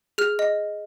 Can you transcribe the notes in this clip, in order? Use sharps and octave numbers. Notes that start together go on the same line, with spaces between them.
G#4 F6
D#5